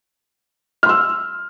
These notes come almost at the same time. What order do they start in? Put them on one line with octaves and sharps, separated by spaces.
F6 C6 E6